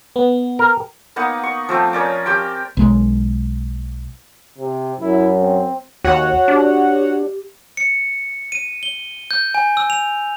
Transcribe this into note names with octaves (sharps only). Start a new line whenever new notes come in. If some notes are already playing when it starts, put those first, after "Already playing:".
B3
A#4
A#3 B3 D#4 F#5
C#6
F3 A3 C4
C#4 A#4 D5
C4 G4 C5 G5
B1 G#3
C3
F#2 E4
C4
D#2 F#4 C#5 F#5
D4 G4
C#7
D#7
G7
G6
G#5
E6
F7